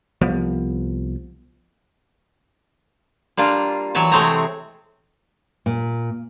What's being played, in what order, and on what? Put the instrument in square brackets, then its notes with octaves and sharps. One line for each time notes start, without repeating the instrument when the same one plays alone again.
[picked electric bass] C2 F3 B3
[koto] G3 A#3 D4 F4
E3 F#3 C#5 A5
C3 G#3 A3 C4 C#5 A#5
[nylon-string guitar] A#2